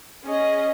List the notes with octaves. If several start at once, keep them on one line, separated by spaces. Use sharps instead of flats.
C#4 G#4 D#5